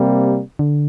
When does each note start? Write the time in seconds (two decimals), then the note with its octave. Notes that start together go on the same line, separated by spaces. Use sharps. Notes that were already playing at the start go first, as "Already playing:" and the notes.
Already playing: C3 G3 A#3
0.59 D3